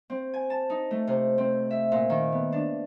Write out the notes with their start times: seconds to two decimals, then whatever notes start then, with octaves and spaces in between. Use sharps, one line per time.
0.10 C4
0.34 G#5
0.50 A5
0.70 D#4
0.91 A3
1.07 C3
1.38 C4
1.71 E5
1.92 A#2
2.10 D#3
2.32 B3
2.52 D4